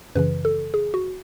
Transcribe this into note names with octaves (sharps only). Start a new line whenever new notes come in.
F#2 C#3 E3 B4
A4
G#4
F#4